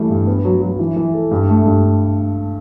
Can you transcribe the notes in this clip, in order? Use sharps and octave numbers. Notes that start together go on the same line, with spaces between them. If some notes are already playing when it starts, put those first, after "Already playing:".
Already playing: E3 G3 A3
G2
B3
F#3
F#3
E3
E3
A4
G2
A3
G2